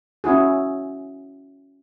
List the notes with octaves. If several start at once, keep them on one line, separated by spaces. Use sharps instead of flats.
C#4 E4 F#4 G#4